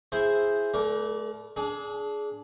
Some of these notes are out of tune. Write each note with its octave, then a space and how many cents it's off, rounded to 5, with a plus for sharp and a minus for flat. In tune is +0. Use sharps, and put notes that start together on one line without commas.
E4 +5 G#4 +0 C5 +0
A3 -35 A#4 +25 D5 -15
D4 -20 G#4 +15